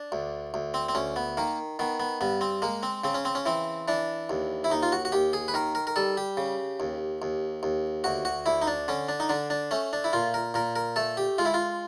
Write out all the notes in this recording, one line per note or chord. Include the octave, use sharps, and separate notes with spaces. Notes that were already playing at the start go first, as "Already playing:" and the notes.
Already playing: D4
D2
D2
C4
C4
D2 C#4
B3
D#3 A#3
D#3 B3
B3
G2 B3
C4
G#3 A#3
C4
C#3 C4
C#4
C4
C#4
E3 C4
E3 D4
D#2
E4
D#2 D#4
F4
F#4
F#4
D#2 G4
G#4
B4
D#3 A#4
A#4
A#4
G3 A4
G4
C#3
D#2
D#2
D#2
D2 F#4
F#4
D2 E4
D#4
D4
D3 C#4
D4
D#4
D3 D4
D4
A3 C#4
D4
E4
A#2 F4
A#4
A#2 A#4
A#4
A3 A4
G4
G#3 F4
E4
F4